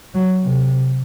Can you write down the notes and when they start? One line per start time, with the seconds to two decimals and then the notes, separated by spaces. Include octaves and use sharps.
0.14 F#3
0.44 C3